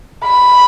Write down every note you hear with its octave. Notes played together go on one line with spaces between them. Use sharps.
B5